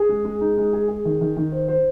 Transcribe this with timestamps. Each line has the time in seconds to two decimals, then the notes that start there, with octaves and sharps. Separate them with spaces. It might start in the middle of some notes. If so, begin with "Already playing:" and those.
Already playing: G#4
0.09 G#3
0.25 G#3
0.41 D#4
0.57 G#3
0.73 G#4
0.88 G#4
1.05 D#3
1.21 D#3
1.37 D#3
1.52 C5
1.68 C5